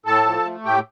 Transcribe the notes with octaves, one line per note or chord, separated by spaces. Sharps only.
A2 A4 A5
F3
A3
A2 G4 G5